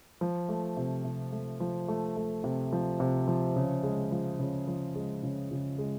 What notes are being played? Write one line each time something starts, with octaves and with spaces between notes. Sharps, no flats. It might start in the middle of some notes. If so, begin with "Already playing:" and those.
F3
A3
C3
C3
A3
F3
A3
A3
C3
F3
C3
F3
C#3
G#3
F3
C#3
F3
G#3
C#3
C#3
G#3